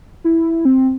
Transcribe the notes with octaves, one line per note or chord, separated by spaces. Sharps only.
E4
C4